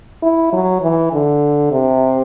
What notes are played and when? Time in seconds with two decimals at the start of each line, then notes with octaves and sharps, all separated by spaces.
0.22 E4
0.52 F#3
0.81 E3
1.12 D3
1.72 C3